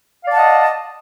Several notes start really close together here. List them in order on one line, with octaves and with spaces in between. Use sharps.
F5 D5 A5 F#5 D#5